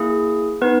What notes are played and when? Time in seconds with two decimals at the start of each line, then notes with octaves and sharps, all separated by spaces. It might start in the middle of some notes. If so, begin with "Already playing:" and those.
Already playing: A#3 E4 G#4
0.61 B3 D#4 B4